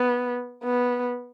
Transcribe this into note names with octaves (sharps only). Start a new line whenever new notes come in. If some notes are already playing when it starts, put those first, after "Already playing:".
Already playing: B3
B3